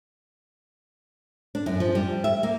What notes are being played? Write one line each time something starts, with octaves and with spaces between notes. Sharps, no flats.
D4
F#2
F3
G3
E5
A#3